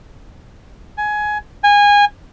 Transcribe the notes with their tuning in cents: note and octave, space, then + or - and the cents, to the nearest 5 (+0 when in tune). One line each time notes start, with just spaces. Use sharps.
G#5 +15
G#5 -20